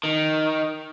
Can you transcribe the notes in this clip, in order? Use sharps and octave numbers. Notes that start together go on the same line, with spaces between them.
D#3